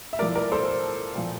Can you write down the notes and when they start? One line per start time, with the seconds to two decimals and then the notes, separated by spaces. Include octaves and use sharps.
0.13 E5
0.19 A2 A#4 D5
0.22 F3
0.35 A#4 D5
0.52 A4 C5
1.15 A#2 F3